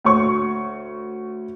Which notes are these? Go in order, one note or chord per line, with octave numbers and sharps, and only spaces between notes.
D2 C#5 C#6